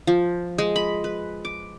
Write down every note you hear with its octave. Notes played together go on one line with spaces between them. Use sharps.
F3
G#3
B5
B4
D6